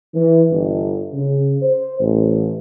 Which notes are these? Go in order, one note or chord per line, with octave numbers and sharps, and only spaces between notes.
E3
G1
C#3
C5
A1